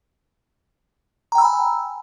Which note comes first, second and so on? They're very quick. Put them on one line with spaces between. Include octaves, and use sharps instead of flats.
A#5 G5 E6 B5 G#5